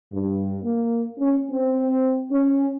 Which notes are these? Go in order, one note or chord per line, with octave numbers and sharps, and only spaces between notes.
G2
A#3
C#4
C4
C#4